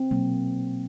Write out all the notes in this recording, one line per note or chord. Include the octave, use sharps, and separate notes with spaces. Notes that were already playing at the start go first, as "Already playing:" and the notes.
Already playing: C4
B2 F#3 A#3